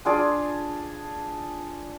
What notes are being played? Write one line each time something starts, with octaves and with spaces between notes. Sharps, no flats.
D4 F4 G#4 D5